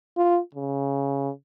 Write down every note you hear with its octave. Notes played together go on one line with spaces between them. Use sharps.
F4
C#3